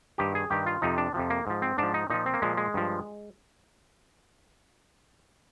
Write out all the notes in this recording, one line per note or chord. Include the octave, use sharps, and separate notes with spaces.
G2 D#3 G4
G#4
G2 D#3 G4
F4
F2 C3 F3 D#4
D4
F2 C3 F3
A#3
G#2 F3
C4
G#2 F3 D4
D#4
A#2 F3 D#4
C4
A#3
A#2 F3 G#3
G#3
G2 F3